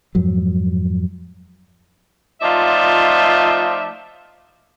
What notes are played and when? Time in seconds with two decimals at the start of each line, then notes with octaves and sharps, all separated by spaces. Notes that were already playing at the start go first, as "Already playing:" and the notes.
0.15 F2 G#2 F3 F#3
2.42 F3 A3 D#4 F4 D5 E5